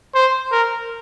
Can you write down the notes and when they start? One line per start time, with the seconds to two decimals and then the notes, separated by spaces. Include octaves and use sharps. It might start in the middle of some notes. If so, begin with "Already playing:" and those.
0.15 C5
0.51 A#4